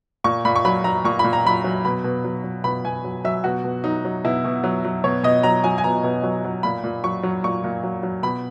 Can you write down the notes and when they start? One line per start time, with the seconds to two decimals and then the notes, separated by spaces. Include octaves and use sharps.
0.24 A#2 C#6
0.45 A#2 B5
0.56 C#6
0.65 F#3 B5
0.84 F#3 A#5
1.04 A#2 C#6
1.19 A#2 B5
1.33 A#5
1.45 F#3 B5
1.64 F#3
1.85 B2 B5
2.04 B2
2.24 F#3
2.44 F#3
2.64 B2 B5
2.84 B2 G#5
3.04 F#3
3.24 F#3 E5
3.44 B2 F#4
3.64 B2
3.84 F#3 D#4
4.05 F#3
4.24 B2 E4
4.44 B2
4.64 F#3
4.84 F#3
5.04 B2 C#5
5.23 B2 D#5
5.43 F#3 A#5
5.64 F#3 G#5
5.78 G#5
5.84 B2 A#5
6.03 B2
6.23 F#3
6.44 F#3
6.63 A#2 B5
6.84 A#2
7.04 F#3 C#6
7.23 F#3
7.44 A#2 C#6
7.64 A#2
7.84 F#3
8.03 F#3
8.23 B2 B5